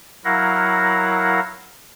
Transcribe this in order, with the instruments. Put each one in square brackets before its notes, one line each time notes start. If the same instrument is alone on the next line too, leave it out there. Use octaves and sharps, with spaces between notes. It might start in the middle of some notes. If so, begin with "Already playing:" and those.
[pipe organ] F#3 E4 A#4 F5 F#5 A#6